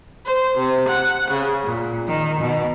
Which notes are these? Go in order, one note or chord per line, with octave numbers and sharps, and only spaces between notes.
C5
C3
F#5
C#3
A#2
D#3
B2